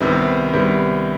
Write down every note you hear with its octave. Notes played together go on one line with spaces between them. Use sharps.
C2 C3 D#3 G3 B3
C2 C3 D#3 G3 B3